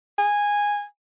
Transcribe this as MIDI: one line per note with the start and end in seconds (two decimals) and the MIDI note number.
0.18 0.84 80